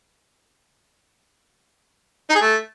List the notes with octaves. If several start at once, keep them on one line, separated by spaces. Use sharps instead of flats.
D#4
G#4
A3